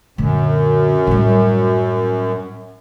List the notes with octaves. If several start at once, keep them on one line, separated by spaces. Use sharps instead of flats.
F#2 A#2 D3
A2 G3